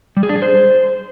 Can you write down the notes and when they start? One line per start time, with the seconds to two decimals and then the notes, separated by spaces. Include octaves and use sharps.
0.17 G3
0.23 G#4
0.29 D4
0.36 G#4
0.42 C5